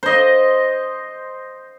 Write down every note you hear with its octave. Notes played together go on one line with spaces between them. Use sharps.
C5 D#5